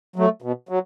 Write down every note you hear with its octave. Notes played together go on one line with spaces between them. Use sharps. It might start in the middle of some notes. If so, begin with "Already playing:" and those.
F#3 A3
B2
F#3